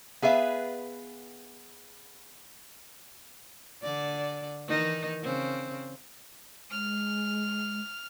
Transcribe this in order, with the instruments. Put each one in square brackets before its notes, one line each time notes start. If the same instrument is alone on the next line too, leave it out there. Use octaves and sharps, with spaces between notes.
[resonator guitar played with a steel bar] B3 G#4 B4 E5 F5
[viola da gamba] D3 D5
D#3 E3 D#4
C#3 C4
[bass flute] G#3 [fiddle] F6